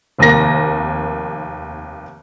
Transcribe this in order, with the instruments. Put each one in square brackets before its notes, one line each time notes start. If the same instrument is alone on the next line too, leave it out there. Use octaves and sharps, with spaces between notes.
[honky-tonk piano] F1 D#2 A#3 A#6